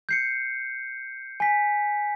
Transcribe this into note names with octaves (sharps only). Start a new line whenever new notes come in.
G6 C7 C#7
G#5 B6